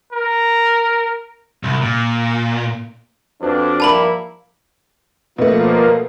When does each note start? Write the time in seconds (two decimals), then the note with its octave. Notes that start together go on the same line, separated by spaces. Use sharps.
0.13 A#4
1.63 C2
1.82 A#2
3.41 F2 D4 F#4 B4 C5
3.80 G2 F3 G3 A#3 E4 A5 B5 F#7
5.38 B2 F3 A3 A#3